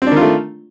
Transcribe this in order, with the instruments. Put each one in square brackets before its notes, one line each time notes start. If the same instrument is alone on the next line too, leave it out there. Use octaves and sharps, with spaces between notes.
[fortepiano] C4
D4
D#3
F4
A3